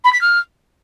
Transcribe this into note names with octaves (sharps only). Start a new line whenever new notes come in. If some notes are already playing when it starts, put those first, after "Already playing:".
B5
B6
F6